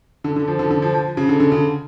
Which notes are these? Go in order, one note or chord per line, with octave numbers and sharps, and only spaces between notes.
D3
D3
F3
D3
D3
F3
F3
C#3
D3
D3
C#3